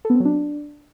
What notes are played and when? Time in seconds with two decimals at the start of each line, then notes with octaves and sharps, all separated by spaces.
0.05 A4
0.10 B3
0.15 C4
0.20 F#3
0.25 D4